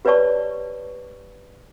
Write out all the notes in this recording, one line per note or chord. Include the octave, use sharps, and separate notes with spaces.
G4 B4 C#5 D5 A5 C#6